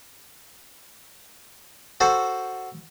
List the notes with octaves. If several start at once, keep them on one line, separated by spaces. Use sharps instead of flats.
F#4 A4 C5